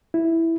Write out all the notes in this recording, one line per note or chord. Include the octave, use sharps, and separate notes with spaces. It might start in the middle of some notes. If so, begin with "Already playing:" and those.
E4